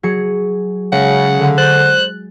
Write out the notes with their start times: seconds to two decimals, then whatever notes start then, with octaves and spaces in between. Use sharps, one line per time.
0.03 F#3 G#4 C#7
0.92 C#3 G#3 F#5
1.37 D3
1.58 C5 F#6 G6 A6